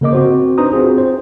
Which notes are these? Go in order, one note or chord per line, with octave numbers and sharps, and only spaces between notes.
C#3 A#3 A#4 D#5 D6
C4 F#4 C5
D4 D#4 B4 C5 A#5 D#6
C4 F4 F#4 G#4
C5